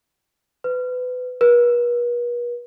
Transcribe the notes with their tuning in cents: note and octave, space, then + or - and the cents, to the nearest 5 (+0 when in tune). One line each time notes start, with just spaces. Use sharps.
B4 +25
B4 -45